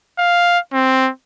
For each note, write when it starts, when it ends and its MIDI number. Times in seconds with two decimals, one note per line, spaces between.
0.18 0.58 77
0.73 1.09 60